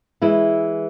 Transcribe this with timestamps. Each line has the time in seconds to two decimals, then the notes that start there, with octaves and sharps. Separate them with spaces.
0.22 E3 G#3 E4